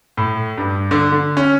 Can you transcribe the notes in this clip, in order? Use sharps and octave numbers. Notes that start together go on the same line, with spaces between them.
A2
G2
D3
D3
C#4